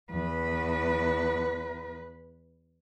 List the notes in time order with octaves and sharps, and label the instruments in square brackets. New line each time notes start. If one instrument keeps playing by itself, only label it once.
[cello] E2 B4